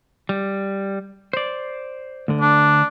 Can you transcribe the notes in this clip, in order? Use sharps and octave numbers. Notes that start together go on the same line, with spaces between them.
G3
C5 D5
D2 D3
D4